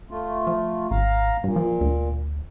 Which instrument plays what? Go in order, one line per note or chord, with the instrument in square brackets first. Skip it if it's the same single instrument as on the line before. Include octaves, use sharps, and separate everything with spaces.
[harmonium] A3 F4
[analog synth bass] F3
[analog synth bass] G#1 [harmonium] F5 A#5
[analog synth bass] G2 [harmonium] A#2
[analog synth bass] F3
D2